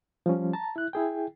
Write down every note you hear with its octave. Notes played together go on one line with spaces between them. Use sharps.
F3 G3 C#4
A5 A#5
E4 F#6
E4 G#4 G5